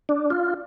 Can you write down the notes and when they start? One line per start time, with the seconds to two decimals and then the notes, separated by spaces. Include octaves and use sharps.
0.09 D4
0.30 F4